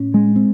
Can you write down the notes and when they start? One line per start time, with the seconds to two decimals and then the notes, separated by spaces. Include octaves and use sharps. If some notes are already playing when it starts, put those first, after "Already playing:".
Already playing: A2 C#4
0.14 G#3
0.36 C4